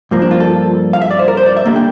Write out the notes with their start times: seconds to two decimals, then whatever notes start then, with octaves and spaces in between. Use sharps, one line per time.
0.11 G2 F3 A#3
0.22 D4
0.31 F4
0.40 A4
0.93 F5
1.01 E5
1.11 D5
1.19 C5
1.28 A#4
1.37 C5
1.46 D5
1.57 E5
1.66 D3 G3 A#3
1.76 G5